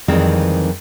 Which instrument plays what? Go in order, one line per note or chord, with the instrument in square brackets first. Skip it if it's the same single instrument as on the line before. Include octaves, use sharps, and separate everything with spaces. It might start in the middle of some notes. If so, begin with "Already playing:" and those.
[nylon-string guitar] F2 D#3 E3 G3 G#3 C4